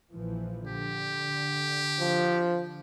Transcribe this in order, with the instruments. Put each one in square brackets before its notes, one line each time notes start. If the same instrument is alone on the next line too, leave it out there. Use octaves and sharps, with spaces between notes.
[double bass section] A#1 E3 F3
[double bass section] D3 [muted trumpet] G4
[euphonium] F3